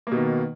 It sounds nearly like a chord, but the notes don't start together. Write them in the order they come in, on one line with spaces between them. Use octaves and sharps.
A#3 B2 D#3